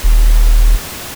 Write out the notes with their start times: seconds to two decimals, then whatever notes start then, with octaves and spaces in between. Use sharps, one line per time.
0.04 D#1